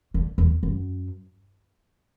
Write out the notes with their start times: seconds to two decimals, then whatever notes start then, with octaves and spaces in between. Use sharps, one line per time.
0.14 D3
0.38 E2
0.63 F#2